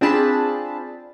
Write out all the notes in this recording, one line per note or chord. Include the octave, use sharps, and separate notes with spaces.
C4 D4 F4 G#4 A5 B5